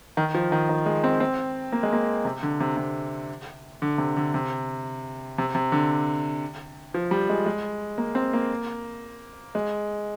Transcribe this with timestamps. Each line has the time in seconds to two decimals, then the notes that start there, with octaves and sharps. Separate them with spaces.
0.17 D#3
0.35 F3
0.52 D#3
0.69 D#3
0.86 G#3
1.04 C4
1.20 C4
1.72 A#3
1.83 G#3
1.93 A#3
2.25 C3
2.43 D3
2.60 C3
2.77 C3
3.82 D3
3.98 C3
4.17 D3
4.34 C3
5.38 C3
5.55 C3
5.72 D3
6.94 F3
7.11 G3
7.29 G#3
7.46 G#3
7.98 A#3
8.15 C4
8.33 A#3
9.55 G#3